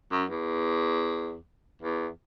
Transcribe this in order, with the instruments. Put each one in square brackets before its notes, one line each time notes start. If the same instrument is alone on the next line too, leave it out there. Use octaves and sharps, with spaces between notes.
[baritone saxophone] F#2
E2
E2